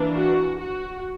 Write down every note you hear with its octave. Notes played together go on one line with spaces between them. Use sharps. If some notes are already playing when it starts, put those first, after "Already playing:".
Already playing: E3 A#3 D4
F#4
F#4